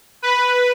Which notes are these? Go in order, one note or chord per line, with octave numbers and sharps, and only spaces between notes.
B4